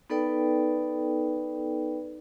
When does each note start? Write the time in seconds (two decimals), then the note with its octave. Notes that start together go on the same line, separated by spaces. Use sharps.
0.10 B3 D#4 A4 B4 D5 G5